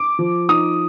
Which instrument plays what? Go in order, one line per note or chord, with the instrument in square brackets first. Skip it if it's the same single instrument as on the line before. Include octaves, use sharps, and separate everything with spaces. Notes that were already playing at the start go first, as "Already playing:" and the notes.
Already playing: [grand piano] D6
F3
D#4 D#6